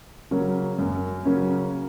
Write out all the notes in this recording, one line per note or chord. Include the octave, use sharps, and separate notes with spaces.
C#3 F#3 A#3 C#4
F#2
C#3 F#3 A#3 C#4